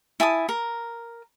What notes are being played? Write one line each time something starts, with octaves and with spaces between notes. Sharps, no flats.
E4 G#5 A5 D#6
A#4